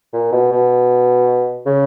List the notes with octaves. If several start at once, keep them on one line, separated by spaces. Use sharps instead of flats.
A#2
B2
B2
C#3